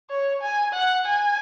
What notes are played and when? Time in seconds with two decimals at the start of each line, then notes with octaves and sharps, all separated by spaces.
0.10 C#5
0.42 G#5
0.73 F#5
1.06 G#5